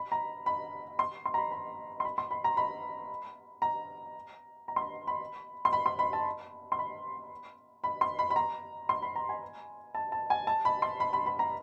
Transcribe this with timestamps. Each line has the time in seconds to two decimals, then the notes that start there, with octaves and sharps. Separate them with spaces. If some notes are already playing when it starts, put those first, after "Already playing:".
Already playing: B5
0.12 A#5
0.46 B5
0.99 C6
1.25 C6
1.34 A#5
1.38 B5
1.51 B5
2.00 C6
2.05 B5
2.18 C6
2.31 B5
2.44 A#5
2.57 B5
3.62 A#5
4.68 A#5
4.76 C6
4.81 B5
5.07 B5
5.65 C6
5.73 B5
5.86 C6
5.99 B5
6.13 A5
6.72 C6
6.79 B5
7.84 B5
8.01 C6
8.19 B5
8.30 B5
8.36 A#5
8.89 C6
9.02 B5
9.16 A#5
9.29 G#5
9.95 A5
10.12 A5
10.30 G#5
10.47 A5
10.65 B5
10.82 C6
11.00 B5
11.13 B5
11.26 B5
11.39 A#5